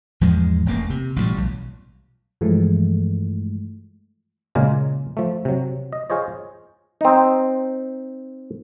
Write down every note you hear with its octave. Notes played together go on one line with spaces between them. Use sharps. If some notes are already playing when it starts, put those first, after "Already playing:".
E2 G#2 F3 G#3
E1 A1 A#3
C3
A1 A#2 E3 G3
B1
G2 E3 F3 G#3 A3
A#2 C#3 G#3 A#3 F4
F3 A3
C3 F#3
D#5
F4 G#4 C5 C#5 D#5
C4 D#4